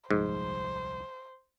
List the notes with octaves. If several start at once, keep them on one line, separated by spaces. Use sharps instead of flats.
D#1 C2 G#2 F3 C5